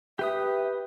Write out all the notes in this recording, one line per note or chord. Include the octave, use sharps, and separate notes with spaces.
G4 B4 E5 D#6